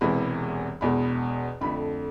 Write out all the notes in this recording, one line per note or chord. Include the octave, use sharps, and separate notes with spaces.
E1 E2 C3 E3 G#3 B5
E1 E2 B2 G#3 B5
F2 D3 A3 B5